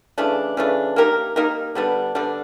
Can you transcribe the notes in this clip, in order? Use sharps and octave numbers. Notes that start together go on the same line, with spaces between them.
C#3 E3 A3 D4
C#3 E3 A3 D4
A#3 D#4 G4 A#4
A#3 D#4 G4 A#4
D3 G3 B3 D4
D3 G3 B3 D4